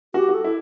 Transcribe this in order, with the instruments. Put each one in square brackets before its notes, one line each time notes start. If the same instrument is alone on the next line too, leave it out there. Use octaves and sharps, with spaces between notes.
[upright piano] F#4 [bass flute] G4
[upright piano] F#4
[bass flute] A4
[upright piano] E4